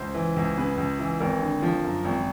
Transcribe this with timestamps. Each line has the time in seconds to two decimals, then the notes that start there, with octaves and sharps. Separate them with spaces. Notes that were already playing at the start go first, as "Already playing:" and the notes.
Already playing: C#2 C5
0.14 E3
0.36 C#2
0.58 C#3 B4
0.78 C#2
0.99 E3
1.20 G#1 A#4
1.41 D3
1.62 F3
1.84 F#2
2.05 G#1